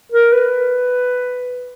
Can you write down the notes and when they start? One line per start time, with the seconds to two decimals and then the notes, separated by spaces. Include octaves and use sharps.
0.12 A#4
0.33 B4